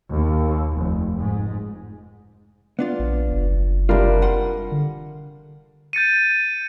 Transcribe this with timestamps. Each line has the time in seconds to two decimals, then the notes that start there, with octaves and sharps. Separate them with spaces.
0.14 D#2
0.78 F1
1.19 G#2
2.79 B3 D4 F4
2.99 A#1
3.31 F#1
3.89 C2 G3 D4 F4 A#4
4.22 F#5 C6
4.72 D3
5.93 G6 A6 C#7 D#7